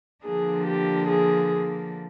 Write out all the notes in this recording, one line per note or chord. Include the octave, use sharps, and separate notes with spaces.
D3 F3 A#3 D4 G#4
G4
G#4